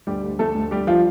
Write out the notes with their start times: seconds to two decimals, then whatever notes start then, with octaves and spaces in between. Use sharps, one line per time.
0.07 D2 G3 G4
0.24 D2
0.39 D2 A3 A4
0.55 D2
0.71 G3 G4
0.87 F3 G3 F4